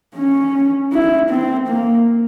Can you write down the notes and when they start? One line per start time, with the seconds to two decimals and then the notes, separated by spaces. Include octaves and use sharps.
0.16 C#4
0.93 E4
1.30 C4
1.68 A#3